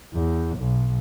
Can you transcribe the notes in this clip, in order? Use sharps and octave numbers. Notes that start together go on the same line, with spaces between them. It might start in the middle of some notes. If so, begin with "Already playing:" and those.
E2
B1